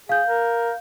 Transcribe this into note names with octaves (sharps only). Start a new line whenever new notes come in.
G#4 F5 G6
A#4